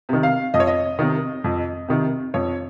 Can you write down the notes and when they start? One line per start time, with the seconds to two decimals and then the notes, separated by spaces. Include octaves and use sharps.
0.09 C3 D#3
0.23 F5
0.54 F2 D#5
0.60 C#5
0.67 D#5
0.99 C3 D#3
1.44 F2
1.88 C3 D#3
2.34 F2 C#5